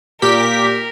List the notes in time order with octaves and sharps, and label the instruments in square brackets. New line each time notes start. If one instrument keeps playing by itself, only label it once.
[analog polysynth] A#2 G4 B6 [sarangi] A#4